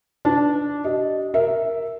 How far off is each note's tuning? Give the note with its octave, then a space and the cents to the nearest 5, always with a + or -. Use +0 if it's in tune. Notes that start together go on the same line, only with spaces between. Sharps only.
D4 -10 B4 +20
G4 -35 D#5 +0
A#4 +0 E5 +0